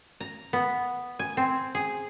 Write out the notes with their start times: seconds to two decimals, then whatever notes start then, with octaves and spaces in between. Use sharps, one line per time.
0.21 A#5
0.53 B3
1.19 G#5
1.37 C4
1.75 G#4